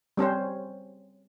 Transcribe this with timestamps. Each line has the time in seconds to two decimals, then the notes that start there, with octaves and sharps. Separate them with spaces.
0.17 G3 C4 C#4 C5